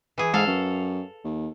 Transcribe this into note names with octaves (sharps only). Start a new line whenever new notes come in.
E3 G#4
G#2 A4 F5
F#2
D#2